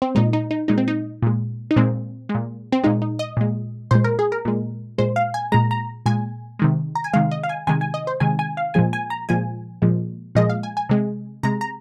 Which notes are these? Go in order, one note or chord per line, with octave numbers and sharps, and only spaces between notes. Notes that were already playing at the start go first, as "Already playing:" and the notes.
C4
A#2 G#3 D#4
D#4
D#4
A#2 G#3 D#4
C4
D#4
A#2 G#3
D#4
A#2 G#3 C4
G#3
A#2
C4
A#2 G#3 D#4
D#4
D#5
A#2 G#3
A#2 G#3 C5
A#4
G#4
A#4
A#2 G#3
A#2 G#3 C5
F5
G#5
A#2 G#3 A#5
A#5
A#2 G#3 G#5
C3 D#3 G#3
A#5
G#5
C3 D#3 G#3 F5
D#5
F5
G#5
C3 D#3 G#3 G#5
G#5
D#5
C5
C3 D#3 G#3 G#5
G#5
F5
A#2 F3 G#3 G#5
G#5
A#5
A#2 F3 G#3 G#5
A#2 F3 G#3
A#2 F3 G#3 D#5
F5
G#5
G#5
C3 G#3
C3 G#3 A#5
A#5